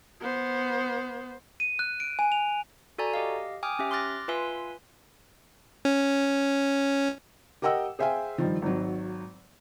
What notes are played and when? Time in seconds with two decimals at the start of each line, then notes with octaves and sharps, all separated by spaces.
0.21 B3 C5
1.60 D#7
1.79 F#6
2.00 D7
2.19 G#5
2.32 F7
2.98 F#4 A4 D5 G#5 A#5
3.14 G4 D#5 F5
3.63 G5 G#5 D6 D#6 F6
3.79 C#4 G4 E5
3.91 C6 D6 F6 F#6 A6 A#6
4.28 F4 B4 E5 G#5 C6 E6
5.85 C#4
7.62 G4 A#4 D#5 F#5 G5 E6
7.99 G#4 C5 E5 F5 G5 G#5
8.38 G2 D#3 F3
8.62 G#1 D#3 F#3